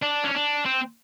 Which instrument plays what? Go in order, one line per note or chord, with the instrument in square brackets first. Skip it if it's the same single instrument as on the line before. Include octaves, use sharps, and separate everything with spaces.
[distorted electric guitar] D4
C#4
D4
C4